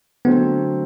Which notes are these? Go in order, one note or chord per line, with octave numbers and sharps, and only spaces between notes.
D3 F#3 A3 B3 C4